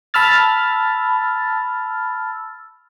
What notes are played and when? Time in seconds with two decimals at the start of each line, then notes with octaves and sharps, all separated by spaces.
0.14 A5 B5 E6 F6 A6